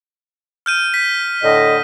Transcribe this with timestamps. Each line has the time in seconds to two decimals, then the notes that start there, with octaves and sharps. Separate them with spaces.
0.66 F6 G6 D#7
0.94 B6
1.43 A2 D3 D#5